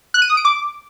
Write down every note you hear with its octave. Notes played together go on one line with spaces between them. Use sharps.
F#6
D#7
D#6
D7
D6